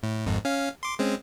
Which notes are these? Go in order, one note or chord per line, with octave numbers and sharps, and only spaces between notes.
A2
G#1 F2 G#2
C#4 F5
C6 D6
G#3 C4 C#4